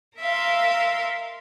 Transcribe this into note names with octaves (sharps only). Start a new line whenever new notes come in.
A#4 E5 F5 C6